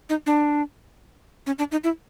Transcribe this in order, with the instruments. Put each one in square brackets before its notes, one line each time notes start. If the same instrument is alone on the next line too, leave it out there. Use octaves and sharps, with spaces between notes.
[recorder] D#4
D4
C#4
D4
D#4
E4